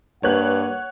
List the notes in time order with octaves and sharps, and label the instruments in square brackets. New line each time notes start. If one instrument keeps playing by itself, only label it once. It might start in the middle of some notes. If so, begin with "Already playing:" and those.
[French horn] G2 [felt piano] A#3 B4 [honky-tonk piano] C#5 F#6 [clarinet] F#5